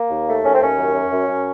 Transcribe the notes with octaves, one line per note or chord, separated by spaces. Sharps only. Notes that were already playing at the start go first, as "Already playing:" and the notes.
Already playing: A#3
D#2
A3
D#2 C#4
C4
D#2 C#4
F#2
F#2
F#2
F#2